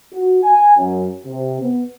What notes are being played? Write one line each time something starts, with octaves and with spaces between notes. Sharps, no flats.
F#4
G#5
F#2
C3
B3